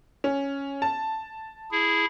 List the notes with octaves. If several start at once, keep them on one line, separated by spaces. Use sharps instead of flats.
C#4
A5
E4 G#4